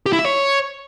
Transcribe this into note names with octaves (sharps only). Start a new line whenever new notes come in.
G4
E4
E5
C#5